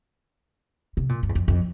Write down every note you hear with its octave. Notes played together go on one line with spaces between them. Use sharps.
C3
A#2
G2
E2
F2
F2